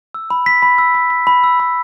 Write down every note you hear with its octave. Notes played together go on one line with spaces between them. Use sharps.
E6
B5
B6
B5
E6
B5
B6
B5
E6
B5